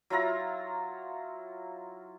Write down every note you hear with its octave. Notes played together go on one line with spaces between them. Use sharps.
F#3 E4 F4 A#5